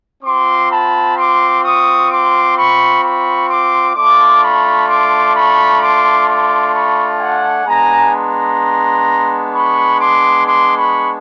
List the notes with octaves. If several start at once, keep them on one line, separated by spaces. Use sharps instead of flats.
C4 F4 C6 D6
A5 B5
C6 D6
C#6 D#6
C6 D6
B5 C#6
B5 C#6
C6 D6
A3 D4 F4 C6 D6
B5 C#6
C6 D6
B5 C#6
C6 D6
C6 D6
B5 C#6
F#5 G#5
G#3 B3 D4 G#5 A#5
A#5 C6
B5 C#6
C6 D6
C6 D6
B5 C#6